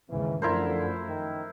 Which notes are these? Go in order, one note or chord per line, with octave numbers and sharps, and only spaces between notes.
D#2 G#2 C#3 E3
F#2 D3 F3 A3 E4 A#4 C5
D#3